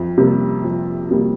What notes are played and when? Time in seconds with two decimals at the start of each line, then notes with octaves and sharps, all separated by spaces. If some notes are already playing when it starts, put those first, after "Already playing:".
Already playing: F2
0.18 C3 G3 A#3
0.64 F2
1.11 C3 G3 A#3